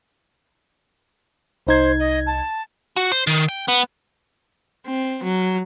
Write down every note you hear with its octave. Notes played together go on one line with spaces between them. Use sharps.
C2 D#4 C5 G#6
D#5
A5
F#4
C5
D#3
G5
B3
C4
F#3